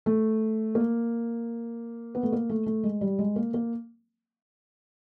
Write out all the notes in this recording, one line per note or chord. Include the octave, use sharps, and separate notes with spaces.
A3
A#3
B3
A3
A#3
A3
A3
G#3
G3
G#3
A#3
A#3